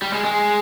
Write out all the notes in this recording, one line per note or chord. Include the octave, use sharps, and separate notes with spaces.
G3
G#3
G#3